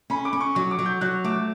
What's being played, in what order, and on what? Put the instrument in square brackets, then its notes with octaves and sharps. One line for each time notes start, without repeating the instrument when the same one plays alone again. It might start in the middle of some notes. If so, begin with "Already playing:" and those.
[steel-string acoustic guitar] C#4 [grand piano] B5
[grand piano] D6
[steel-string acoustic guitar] C#4
[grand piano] C#6
[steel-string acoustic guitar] F#3 [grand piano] C#6
[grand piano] D6
[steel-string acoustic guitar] F#3
[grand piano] G6
[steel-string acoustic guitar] F#3 [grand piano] F#6
[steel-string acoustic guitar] A3 [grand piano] D6